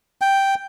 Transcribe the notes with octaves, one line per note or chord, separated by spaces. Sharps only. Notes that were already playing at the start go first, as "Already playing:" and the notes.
G5